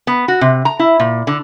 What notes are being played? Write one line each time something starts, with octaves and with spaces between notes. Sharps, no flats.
B3
F#4
C3
A#5
E4
A#2
D3